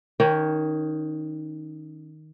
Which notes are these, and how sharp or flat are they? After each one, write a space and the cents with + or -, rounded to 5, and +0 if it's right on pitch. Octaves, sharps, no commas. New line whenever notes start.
D#3 +0 C#4 +25 C#5 -25